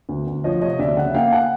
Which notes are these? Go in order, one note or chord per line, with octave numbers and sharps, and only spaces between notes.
D2
D2
F3 C#5 D#5
C3 C#5 D#5
D2 D5 E5
C#3 E5 F#5
A#3 F5 G5
F#5 G#5